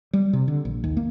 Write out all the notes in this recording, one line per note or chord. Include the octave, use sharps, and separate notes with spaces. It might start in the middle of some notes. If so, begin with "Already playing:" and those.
G3
C3
D3
A#1
D#2
A#3